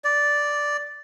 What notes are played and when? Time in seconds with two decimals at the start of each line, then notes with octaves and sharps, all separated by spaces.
0.04 D5